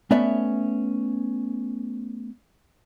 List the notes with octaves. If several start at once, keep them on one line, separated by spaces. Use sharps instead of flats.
A3 B3 C#4 D5 E5